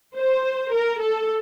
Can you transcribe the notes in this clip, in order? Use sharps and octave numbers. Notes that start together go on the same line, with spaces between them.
C5
A#4
A4